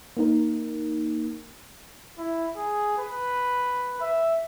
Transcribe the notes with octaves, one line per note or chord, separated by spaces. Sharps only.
A#3 D#4 A#4
E4
G#4
B4
E5